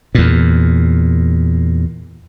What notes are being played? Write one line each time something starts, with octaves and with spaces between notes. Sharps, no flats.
E2 A#2